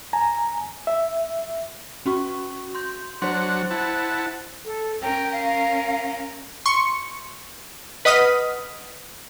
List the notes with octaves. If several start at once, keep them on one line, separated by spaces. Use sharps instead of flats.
G#5 A#5
E5
C#4 F#4 C#6
C6 G6
F#3 D4 C5 F#5 C6
E4 F#5 A5
A4
C#4 A#4 G5
F5
C6 C#6 C#7
B4 D#5 F#5 D#6 F6 B6